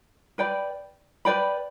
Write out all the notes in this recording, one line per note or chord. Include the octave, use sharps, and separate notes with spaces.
B4 D5 G5 B5
B4 D5 G5 B5